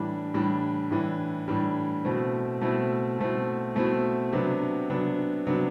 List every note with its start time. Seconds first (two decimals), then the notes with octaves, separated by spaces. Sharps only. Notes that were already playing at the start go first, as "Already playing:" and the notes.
Already playing: A2 E3 G3 D4
0.34 A2 E3 G3 D4
0.91 A2 E3 G3 D4
1.48 A2 E3 G3 D4
2.05 B2 A3 C4 E4
2.61 B2 A3 C4 E4
3.19 B2 A3 C4 E4
3.75 B2 A3 C4 E4
4.33 C3 F#3 B3 D4
4.89 C3 F#3 B3 D4
5.47 C3 F#3 B3 D4